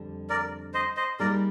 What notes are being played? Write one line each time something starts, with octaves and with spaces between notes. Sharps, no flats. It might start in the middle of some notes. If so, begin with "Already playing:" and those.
Already playing: F2 D3 G3
A#4 D5
C5 D#5
C5 D#5
G3 A#3 D#4 G#4 A#4 D5